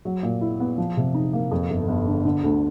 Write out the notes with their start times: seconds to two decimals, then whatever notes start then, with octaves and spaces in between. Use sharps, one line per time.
0.05 F#3
0.23 A#2
0.41 E4
0.60 B3
0.78 F3
0.97 C3
1.14 D#4
1.33 A#3
1.51 F2
1.70 G1
1.88 G1
2.07 D3
2.25 D3
2.43 D2